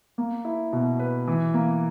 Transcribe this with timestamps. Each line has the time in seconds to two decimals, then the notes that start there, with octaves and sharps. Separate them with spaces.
0.18 A#3
0.45 E4
0.73 B2
0.99 B4
1.28 E3
1.54 A#3